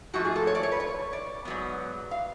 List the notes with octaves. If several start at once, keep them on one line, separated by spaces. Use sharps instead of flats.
G#2 F3 A3 F4 F#4
G#4
A4
C#5
D5
C#5
B4
C#5
D5
G#2 F#3 B3
F5